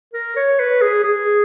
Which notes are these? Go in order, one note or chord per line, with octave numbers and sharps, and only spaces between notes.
A#4
C#5
B4
G#4
G#4